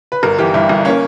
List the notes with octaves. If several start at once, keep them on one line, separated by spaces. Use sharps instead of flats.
B4
G1 A#4
E3 G4
G2 E4
G1
A#3 C#4